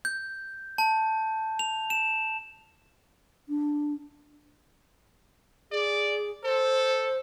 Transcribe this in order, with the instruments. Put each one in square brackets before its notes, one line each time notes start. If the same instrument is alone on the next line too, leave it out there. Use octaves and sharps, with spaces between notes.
[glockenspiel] G6
A5
F7
E7
[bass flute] D4
[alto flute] G#4 [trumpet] D5
[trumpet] A4 [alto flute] C5